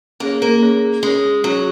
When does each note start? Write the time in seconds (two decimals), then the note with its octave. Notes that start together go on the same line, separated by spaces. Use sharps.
0.20 A#3 C#4 G#4 C#5
0.42 A#3
0.62 C#4 G#4 C#5
1.03 G#3 C#4 G#4 C#5
1.44 F#3 C#4 G#4 C#5